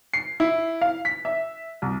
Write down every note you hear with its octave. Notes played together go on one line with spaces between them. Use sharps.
C7
E4
F5
B6
E5
C2